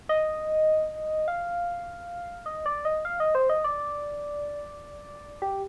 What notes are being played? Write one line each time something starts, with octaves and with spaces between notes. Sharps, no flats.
D#5
F5
D#5
D5
D#5
F5
D#5
C5
D#5
D5
G4